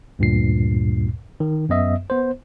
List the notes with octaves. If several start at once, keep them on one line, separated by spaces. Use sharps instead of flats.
D2 G2 A#2 C7
D#3
F#2 B3 D#5 E5
B3 C5